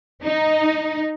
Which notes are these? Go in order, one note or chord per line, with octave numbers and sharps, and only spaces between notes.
D#4